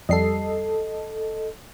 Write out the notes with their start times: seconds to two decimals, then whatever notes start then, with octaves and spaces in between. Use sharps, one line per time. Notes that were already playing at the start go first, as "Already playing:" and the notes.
0.09 F2 G3 A4 D#5 C7